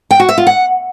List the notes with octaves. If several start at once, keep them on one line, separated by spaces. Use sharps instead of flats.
G5
F#4
E5
F4
F#5